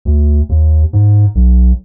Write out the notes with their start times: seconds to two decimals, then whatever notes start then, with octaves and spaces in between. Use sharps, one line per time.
0.05 D2
0.49 D#2
0.93 G#2
1.35 B1